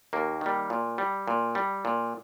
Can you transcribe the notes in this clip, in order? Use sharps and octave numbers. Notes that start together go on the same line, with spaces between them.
D#2 A#3
D#3 G3
A#2
G3
A#2
G3
A#2